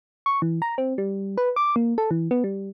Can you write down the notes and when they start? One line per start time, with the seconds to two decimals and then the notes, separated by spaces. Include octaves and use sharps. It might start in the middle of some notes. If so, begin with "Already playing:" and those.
0.26 C#6
0.42 E3
0.62 A#5
0.78 C4
0.98 G3
1.38 B4
1.56 D6
1.76 A#3
1.98 A4
2.11 E3
2.31 B3
2.44 G3